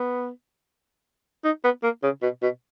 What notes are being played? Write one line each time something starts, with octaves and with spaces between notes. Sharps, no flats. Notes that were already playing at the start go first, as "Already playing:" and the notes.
Already playing: B3
D#4
B3
A#3
C#3
B2
B2